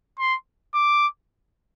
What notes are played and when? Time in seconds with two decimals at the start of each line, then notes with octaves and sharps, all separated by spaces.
0.19 C6
0.74 D6